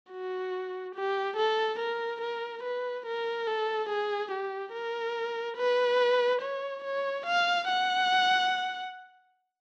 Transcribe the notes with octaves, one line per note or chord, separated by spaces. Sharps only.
F#4
G4
A4
A#4
A#4
B4
A#4
A4
G#4
G4
A#4
B4
C#5
C#5
F5
F#5